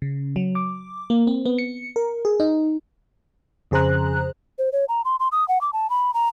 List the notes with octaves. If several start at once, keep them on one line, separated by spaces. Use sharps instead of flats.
C#3
F#3
D6
A#3
C4
B3
C#7
A#4
G#4
D#4
F2 C#3 G#4 C5 A#5 F#6
C5
C#5
A#5
C6
C6
D#6
F#5
D6
A5
B5
A#5